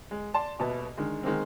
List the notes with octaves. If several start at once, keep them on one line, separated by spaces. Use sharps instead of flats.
G#3
D5 A5 C6
D#1 B2 B3 E5 A5
D3 D#3 G#3
D#3 G#3 A#3 C4